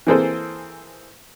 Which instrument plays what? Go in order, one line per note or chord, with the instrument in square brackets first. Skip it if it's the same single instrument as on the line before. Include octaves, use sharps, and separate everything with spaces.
[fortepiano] E3 A#3 C4 G#4 A4 C5